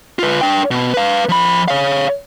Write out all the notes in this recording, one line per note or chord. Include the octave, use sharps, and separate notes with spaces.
F4 B4
D4 G5
B2
B4 F5
F3 B5
C#5 F5